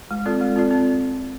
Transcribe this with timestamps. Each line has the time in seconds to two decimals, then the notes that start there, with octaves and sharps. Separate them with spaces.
0.11 G#3
0.26 C4 F4 A4 D5
0.41 G#3
0.56 C4 F4 A4 D5
0.71 C4